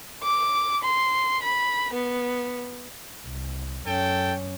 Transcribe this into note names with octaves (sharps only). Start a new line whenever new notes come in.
D6
C6
B5
B3
C2
F#2 C#4 A4 G5